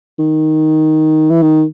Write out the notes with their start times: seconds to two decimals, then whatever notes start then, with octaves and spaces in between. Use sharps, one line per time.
0.19 D#3
1.30 E3
1.42 D#3